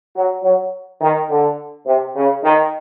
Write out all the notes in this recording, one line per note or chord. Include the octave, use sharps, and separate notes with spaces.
F#3
F#3
D#3
D3
C3
C#3
D#3